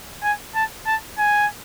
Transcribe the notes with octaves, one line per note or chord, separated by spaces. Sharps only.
G#5
A5
A5
G#5